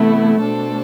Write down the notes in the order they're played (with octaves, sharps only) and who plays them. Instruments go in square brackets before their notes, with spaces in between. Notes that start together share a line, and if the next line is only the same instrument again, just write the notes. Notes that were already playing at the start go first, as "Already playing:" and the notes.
Already playing: [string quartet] C3 E3 B3 E4 [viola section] A3
[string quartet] B2 A3 D4 A4 C5